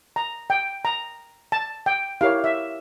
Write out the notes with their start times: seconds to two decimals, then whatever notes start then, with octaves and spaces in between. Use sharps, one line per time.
0.16 A#5
0.50 G5
0.85 A#5
1.52 A5
1.86 G5
2.21 E4 G4 A#4 C#5 F5
2.44 E5